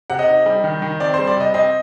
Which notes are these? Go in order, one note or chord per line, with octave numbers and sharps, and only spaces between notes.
C3 F#5
D#5
D#4
G3
D#3
D#3
C4 D5
G3 C5
D5
C3 D#5
C4 D#5